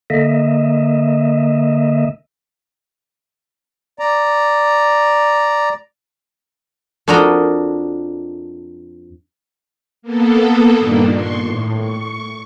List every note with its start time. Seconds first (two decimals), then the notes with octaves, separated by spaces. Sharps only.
0.10 D3 A#3 D#5 E5
3.99 D5 A#5
7.08 F2 D4 F#4 A#4 D#5 A#5
10.02 A#3 B3 A4
10.77 G2 A#2 D#3 A#3 D4
11.13 C6 C#6
11.45 A2
11.79 C#6